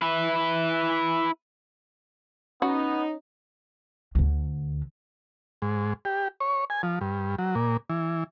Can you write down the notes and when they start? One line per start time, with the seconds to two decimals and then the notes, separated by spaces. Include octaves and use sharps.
0.02 E4 B4
2.62 B3 C#4 D#4 F#4
4.15 D2 D3
5.62 G#2
6.05 G4
6.40 C#5
6.70 G#5
6.83 F3
7.01 G2
7.38 F#3
7.55 A#2
7.90 E3